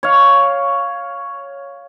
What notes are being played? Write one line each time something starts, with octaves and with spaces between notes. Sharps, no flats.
C#5 F5